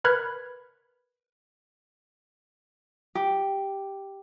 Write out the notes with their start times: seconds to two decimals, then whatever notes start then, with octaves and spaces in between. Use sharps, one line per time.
0.04 A#4 B4 B5 F6 F#6 G#6
3.15 G4